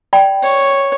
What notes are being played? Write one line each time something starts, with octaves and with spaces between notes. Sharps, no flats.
D5 G5 B5
C#5